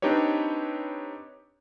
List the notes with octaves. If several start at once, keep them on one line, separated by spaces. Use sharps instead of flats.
C4 D4 D#4 G4 B4 C#5